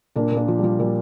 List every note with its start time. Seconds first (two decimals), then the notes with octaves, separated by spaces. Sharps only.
0.16 A#2 A#3 D4
0.31 A#2
0.36 A#3 D4
0.48 F3
0.58 G3
0.64 F3
0.79 A#2 G3